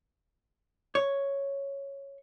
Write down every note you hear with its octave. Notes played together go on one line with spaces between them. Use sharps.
C#5